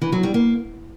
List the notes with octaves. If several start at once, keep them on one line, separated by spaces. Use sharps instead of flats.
E3
F#3
G3
A#3